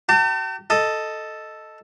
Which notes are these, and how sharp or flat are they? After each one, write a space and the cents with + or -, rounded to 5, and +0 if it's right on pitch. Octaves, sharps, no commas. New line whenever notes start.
G4 -40 A5 +40
A4 +0 D#5 +0